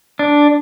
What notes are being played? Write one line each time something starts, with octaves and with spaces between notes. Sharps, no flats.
D4